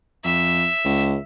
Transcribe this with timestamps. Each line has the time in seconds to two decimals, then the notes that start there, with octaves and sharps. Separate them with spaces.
0.25 F2 E5
0.85 C#2